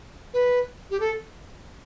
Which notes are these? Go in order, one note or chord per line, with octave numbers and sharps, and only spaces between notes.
B4
G4
A4